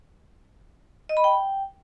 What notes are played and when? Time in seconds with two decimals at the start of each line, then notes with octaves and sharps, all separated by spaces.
1.09 D#5
1.17 B5
1.24 G5